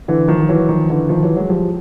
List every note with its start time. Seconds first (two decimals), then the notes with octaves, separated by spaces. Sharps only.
0.08 D3 E3
0.28 D#3 F3
0.40 F3
0.48 E3 F#3
0.69 D#3 F3
0.90 D3 E3
1.09 D#3 F3
1.23 E3 F#3
1.36 F#3 G#3
1.50 F3 G3